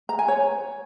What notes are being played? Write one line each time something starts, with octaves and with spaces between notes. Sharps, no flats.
A#5
G#5
C#5